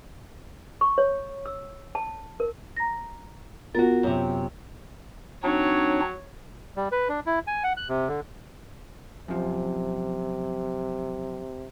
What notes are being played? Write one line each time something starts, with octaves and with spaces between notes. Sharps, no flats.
C#6
C#5
E6
A5
A#4
A#5 A#6
B3 F4 F#4 A#4 A6
F#2 C3
F#3 C4 D4 D#4 C#5
G3
B4
D4
E4
G#5
F#5
F#6
C3
D3
F#2 C3 F3